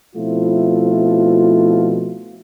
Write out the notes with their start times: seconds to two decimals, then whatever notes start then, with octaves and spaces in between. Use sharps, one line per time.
0.15 B2 F3 A3 C4 E4 F4